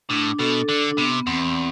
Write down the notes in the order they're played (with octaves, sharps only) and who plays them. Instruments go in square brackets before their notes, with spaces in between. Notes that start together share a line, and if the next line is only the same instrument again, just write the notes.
[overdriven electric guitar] A2 [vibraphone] D4
[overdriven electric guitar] B2 [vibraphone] A4
[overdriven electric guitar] D3 [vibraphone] D4
[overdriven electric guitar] C3 [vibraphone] B3
[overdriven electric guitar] E2 [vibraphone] C4